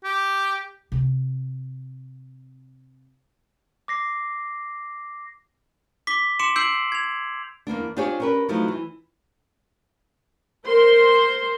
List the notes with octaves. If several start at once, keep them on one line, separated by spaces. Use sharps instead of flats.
G4
C3 C4
D6 A#6 C7
D6 B6 G7
C6 D6 C#7 D7 E7
E6 G6 C7 D7 F#7
G#6 F7
E2 A#3 B3 D4
D4 F4 G4 G#4 C5 C#5
C#4 A#4 B4
F3 F#3 A3 C4 D#4 E4
E3
A#4 C5 C6